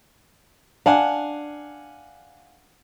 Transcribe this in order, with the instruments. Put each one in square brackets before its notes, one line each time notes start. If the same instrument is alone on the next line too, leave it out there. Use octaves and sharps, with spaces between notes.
[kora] D4 [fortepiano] F5 F#5 G#5